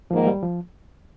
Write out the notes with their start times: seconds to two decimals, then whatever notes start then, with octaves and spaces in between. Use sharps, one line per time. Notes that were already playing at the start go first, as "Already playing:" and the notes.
0.11 G#2 D#3 F3 A#3
0.27 G3
0.43 F3